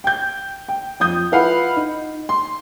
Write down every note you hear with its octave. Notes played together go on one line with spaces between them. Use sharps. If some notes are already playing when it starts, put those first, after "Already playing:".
G5 G6
G5
F2 F3 D#6 G6
E4 F4 B4 F5 F#5 B5
D#4
C6